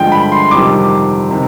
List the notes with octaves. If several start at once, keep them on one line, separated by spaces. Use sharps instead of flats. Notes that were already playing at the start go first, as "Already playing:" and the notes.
Already playing: G2 D3 F3 G#3 G5
B5
C6
F2 C3 D#3 G3 D6
C3 D#3